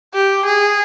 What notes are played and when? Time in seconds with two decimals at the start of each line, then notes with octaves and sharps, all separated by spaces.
0.14 G4
0.46 G#4